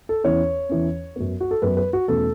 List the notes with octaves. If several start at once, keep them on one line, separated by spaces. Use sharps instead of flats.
A4
E2 E3 C#4 C#5
E2 E3 C#4
F#2 F#3 B3
F#4
A4
F#2 F#3 B3 B4
B4
F#4
E2 B2 A3 C#4 A4